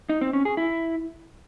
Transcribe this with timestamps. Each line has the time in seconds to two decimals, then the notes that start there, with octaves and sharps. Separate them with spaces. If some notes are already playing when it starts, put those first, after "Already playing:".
0.09 D#4
0.21 C4
0.33 C#4
0.45 G#4
0.57 E4